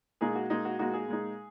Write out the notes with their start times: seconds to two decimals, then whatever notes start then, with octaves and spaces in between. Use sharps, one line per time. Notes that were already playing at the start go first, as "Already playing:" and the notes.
0.21 A#2 G#3 D#4 G#4
0.35 F#4
0.50 A#2 G#3 D#4
0.65 F#4
0.79 A#2 G#3 D#4 F#4
0.94 G#4
1.08 A#2 G#3 D#4